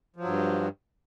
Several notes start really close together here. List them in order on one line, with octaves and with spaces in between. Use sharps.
F3 F#3 G2